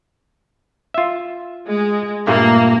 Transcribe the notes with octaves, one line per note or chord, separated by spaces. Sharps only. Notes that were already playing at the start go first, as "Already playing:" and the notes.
F4 E5
G#3
G2 A#2 A3 A#3